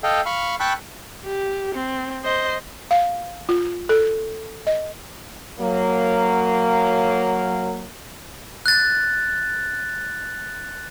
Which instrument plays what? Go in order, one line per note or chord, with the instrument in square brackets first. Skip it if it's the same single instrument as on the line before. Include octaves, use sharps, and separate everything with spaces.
[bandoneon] A4 D#5 F5 G5
F5 B5 C#6 F6
G5 A5 B5 C#6 E6 F#6
[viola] G4
C4
C5 D#5
[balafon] F5
F4
A4
D#5
[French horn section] F#3 A#3
[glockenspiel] F#6 A6